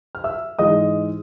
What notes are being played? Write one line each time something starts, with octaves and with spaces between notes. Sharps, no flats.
F6
E5 E6
G#2 E3 G#3 D#5 D#6